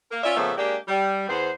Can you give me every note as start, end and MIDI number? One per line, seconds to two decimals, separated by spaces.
0.11 0.21 58
0.11 0.21 70
0.24 0.36 61
0.24 0.36 65
0.24 0.36 74
0.24 0.36 76
0.37 0.52 46
0.37 0.52 49
0.37 0.52 53
0.37 0.52 57
0.37 0.52 59
0.37 0.52 76
0.58 0.77 56
0.58 0.77 58
0.58 0.77 62
0.58 0.77 67
0.88 1.26 55
1.29 1.50 40
1.29 1.50 59
1.29 1.50 72